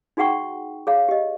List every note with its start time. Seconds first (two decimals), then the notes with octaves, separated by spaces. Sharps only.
0.17 D#4 F#4 G#4 F#5 G5 C#6
0.87 G#4 C#5 F5
1.09 G4 D#5